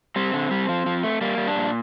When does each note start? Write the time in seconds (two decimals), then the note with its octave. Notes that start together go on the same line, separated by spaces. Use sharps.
0.16 G3 C4
0.33 D3
0.51 G3
0.69 F3
0.86 F3
1.03 A3
1.21 G3 A#3
1.38 G3
1.47 D4
1.55 A#2